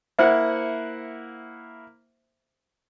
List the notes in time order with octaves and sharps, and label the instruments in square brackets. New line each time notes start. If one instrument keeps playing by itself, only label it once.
[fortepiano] A#3 E4 F#5 [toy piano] C5 E5